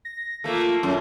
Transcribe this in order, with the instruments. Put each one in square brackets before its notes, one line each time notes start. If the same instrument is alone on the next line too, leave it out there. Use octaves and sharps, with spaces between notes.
[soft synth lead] A#6
[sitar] A3 A#3 [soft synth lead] F4
[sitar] F#2